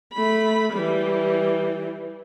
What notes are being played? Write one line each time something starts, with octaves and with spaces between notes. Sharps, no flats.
A3 B5
E3 G3